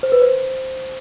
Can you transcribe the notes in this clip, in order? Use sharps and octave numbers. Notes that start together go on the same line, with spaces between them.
C5
B4
C5